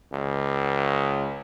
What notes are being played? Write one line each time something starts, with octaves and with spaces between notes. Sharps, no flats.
C#2